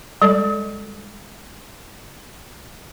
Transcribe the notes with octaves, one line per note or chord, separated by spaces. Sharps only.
G3 G#3 A4 D5